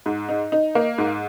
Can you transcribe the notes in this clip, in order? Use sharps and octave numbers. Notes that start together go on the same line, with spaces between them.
G#2
D#4
D#4
A#3
G#2